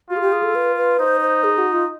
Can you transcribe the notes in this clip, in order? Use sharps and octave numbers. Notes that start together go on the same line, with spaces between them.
F4 F#4
G#4
G4
G#4
A4
B4
B4
D#4 C5
C5
G#4
F#4
F4